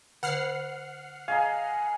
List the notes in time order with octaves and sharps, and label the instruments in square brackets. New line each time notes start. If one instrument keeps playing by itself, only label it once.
[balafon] D3 C5 [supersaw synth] F#5 F6 C7
[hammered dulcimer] G#4 D#5 A#5 [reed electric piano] F5